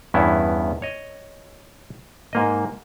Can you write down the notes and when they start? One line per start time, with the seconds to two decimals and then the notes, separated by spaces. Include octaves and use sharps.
0.14 E2 G2 B3 C#4 E4
0.82 C#5 D#5
2.33 G#2 A#3 D#5